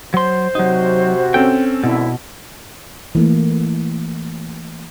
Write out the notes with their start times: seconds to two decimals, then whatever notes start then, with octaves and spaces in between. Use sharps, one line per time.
0.14 F#3 C5 C6
0.55 C3 F#3 D#4 F#4
1.34 C4 C#4 A4 G5
1.84 G#1 F2 B2 D3 E4
3.15 E3 A3 A#3